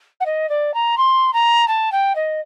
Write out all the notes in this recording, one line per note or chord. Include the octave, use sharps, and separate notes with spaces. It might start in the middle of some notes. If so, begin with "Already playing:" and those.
F#5
D#5
D5
A#5
C6
A#5
A5
G5
D#5